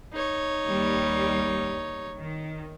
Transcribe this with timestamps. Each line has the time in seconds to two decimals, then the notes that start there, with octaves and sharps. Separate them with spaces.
0.13 D#4 C#5
0.66 D#2 G3
2.16 D#3